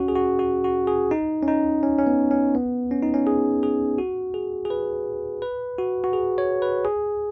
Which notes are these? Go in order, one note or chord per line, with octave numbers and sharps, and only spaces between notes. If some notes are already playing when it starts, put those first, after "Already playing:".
Already playing: C#4 F#4
G#4
F#4
F#4
F#4
G#4
D#4
C#4
D#4
C#4
C#4
B3
C#4
B3
C#4
D#4
C#4
G#4
G#4
F#4
G#4
G#4
B4
B4
F#4
F#4
G#4
C#5
B4
G#4